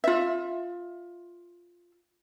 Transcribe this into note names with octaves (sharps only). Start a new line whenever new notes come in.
F4 E5